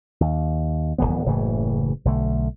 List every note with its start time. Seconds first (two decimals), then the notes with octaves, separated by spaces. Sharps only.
0.21 D#2
0.98 D1 G#1 E3 B3
1.26 F#1 A2 C#3 E3
2.05 B1 D3 A3